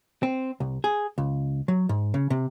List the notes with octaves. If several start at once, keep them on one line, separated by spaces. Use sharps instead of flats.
C4
C2
G#4
C#2
F#3
G#2
C#3
C3